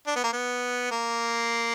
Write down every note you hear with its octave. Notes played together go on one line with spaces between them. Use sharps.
D4
B3
A#3
B3
A#3